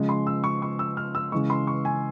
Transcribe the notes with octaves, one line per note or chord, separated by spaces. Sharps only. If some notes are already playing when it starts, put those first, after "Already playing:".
Already playing: C#3 F3 G#3
C6
E6
C#6
C#6
E6
F6
E6
C#3 E3 G#3 C#6
C6
C#6
G#5